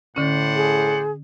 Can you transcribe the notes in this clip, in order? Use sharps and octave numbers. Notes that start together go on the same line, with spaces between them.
A2 D3 C#4 C5 D5 F#5
G#4